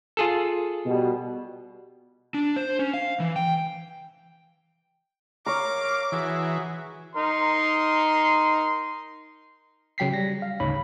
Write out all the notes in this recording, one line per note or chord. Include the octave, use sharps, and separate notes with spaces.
F4 G#4 A4
B2 G3
D4
C5
C#4
F5
E3
G5
A#4 C#5 F5 A#5 D6
E3 F#4 G#4 E5
D#4 A#4 C6
C#3 F#3 G5 B6 C7
G3 A#6
F5
G#1 D2 C#3 D#4 C#5 B5